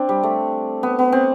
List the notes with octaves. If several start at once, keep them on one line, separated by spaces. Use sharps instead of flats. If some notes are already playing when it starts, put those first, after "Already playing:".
Already playing: C4 D4
G3
A3
B3
B3
C4